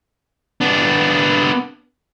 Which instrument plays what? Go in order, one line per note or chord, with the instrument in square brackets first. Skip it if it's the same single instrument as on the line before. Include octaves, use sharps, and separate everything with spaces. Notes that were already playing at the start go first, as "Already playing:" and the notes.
[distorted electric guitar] B3 D4